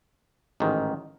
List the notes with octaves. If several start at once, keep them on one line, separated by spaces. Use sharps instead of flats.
A1 G#2 D#3